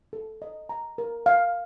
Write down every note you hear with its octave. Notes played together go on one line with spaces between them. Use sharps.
A4
D#5
A#5
A#4
F5